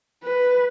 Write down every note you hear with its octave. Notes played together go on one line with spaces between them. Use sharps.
B4